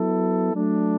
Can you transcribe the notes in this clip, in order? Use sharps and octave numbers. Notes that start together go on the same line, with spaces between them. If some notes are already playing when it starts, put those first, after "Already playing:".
Already playing: F#3 B3 E4 A4
F#3 A3 D4